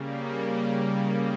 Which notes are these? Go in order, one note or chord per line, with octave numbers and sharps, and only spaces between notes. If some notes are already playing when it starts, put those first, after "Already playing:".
Already playing: C#3 G3 A#3